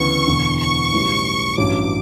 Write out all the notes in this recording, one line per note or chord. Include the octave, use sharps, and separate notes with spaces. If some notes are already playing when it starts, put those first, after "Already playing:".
Already playing: D2 C#3 E3 B3 C#6
E1 E2 D3
C#6
B1 A2 E3 G3 C#4
A1 G2 F#3 C#4 D6